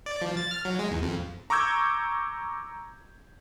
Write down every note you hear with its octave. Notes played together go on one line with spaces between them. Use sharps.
D5
F3
A6
F6
F#3
G#3
E2
F2
A#5 C#6 D6 E6 G6 G#6